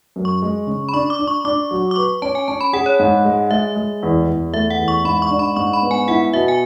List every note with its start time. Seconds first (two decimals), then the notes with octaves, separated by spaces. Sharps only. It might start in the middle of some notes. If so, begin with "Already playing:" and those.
0.16 F#2
0.25 C#6
0.42 G#3
0.67 C#3
0.89 B5
0.93 D4 C#6
1.10 D6
1.19 D4
1.27 C#6
1.45 D4 D6
1.71 F#3
1.91 D6
1.96 B4 C#6
2.22 C#4 A5
2.35 G#5
2.48 C#4 A5
2.61 B5
2.73 G#4 F#5
2.86 C#5
2.99 G#2
3.25 G#3
3.51 G#3 E5
3.76 G#3
4.03 E2
4.27 E2
4.53 A3 E5
4.70 F#5
4.79 E2
4.88 C#6
5.04 G#2 B5
5.22 C#6
5.30 D4
5.39 B5
5.56 G#2 C#6
5.73 B5
5.83 B3
5.91 G#5
6.08 E4 F#5
6.34 B2 E5
6.48 G#5